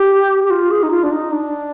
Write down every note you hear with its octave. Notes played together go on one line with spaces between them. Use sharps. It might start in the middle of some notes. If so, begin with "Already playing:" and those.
Already playing: G4
G4
F4
G#4
D#4
F4
D4
D#4
D4